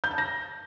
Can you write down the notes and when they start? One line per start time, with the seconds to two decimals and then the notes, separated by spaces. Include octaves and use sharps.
0.04 G6
0.11 A5
0.18 A#6